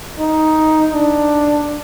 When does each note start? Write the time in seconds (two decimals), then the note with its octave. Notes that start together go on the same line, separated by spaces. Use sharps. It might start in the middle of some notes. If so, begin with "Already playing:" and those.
0.19 D#4
0.94 D4